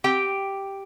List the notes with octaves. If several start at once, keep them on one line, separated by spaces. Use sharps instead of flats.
C4 G4 G5